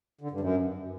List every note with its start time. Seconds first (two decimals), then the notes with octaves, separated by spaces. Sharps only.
0.21 D3
0.31 G2
0.41 F#2